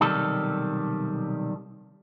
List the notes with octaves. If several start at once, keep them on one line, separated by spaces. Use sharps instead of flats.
B1 C3 D#3 G3 A4